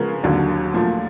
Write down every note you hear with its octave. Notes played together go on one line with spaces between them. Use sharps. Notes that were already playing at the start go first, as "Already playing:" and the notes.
Already playing: C#3 F3 G#3 B3 A#4
D#2 D3 F#3
A#2 F3 A3